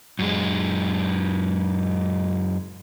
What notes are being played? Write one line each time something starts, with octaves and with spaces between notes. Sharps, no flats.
F#2 G#3